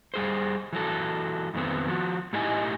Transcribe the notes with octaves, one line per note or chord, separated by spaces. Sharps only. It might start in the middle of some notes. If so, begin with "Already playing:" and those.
G3 G#4 C5
E3 F#3 A4
F2 D#3 F3 B3 C4
F3 F#4
A2 D#4 E4 G4 D#5 G#5